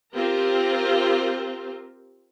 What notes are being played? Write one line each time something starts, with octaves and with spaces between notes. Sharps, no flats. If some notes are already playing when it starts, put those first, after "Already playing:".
C4 F4 G4 A#4 C5